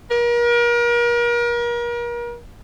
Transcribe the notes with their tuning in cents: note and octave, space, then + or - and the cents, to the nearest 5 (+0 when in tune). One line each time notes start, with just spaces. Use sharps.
A#4 +35